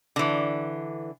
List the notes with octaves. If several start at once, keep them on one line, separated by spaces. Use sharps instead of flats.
D3 E3